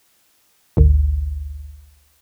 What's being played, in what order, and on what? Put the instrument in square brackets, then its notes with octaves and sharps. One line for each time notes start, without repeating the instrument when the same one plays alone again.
[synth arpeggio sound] G#1 D2